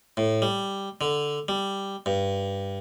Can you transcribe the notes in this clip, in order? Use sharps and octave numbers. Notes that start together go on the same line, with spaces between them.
A2
G3
D3
G3
G2